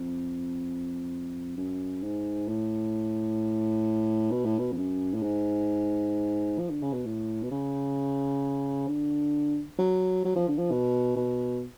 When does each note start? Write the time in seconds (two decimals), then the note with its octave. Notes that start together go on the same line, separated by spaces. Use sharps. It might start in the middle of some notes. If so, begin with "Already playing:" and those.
Already playing: F2
1.57 F#2
2.03 G#2
2.48 A2
4.31 B2
4.45 A2
4.59 B2
4.72 F2
4.77 F#2
5.14 A2
5.23 G#2
6.59 F3
6.70 D3
6.83 C#3
6.93 B2
7.06 A2
7.43 B2
7.51 C#3
8.88 D3
9.79 F#3
10.25 F#3
10.36 F3
10.48 D3
10.58 F3
10.71 B2
11.16 B2